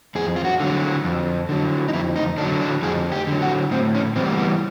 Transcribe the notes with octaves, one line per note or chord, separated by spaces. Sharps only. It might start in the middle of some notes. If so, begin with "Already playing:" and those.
F2 G#4
F4
F#4
D3 F#3
F2
D3 F#3
D#4
F2 E4
D#4
D3 F#3 D4
D4
F2 G#4
G4
D3 F#3
F#4
A2 C4
C#4
E3 G3 C4
A#3
B3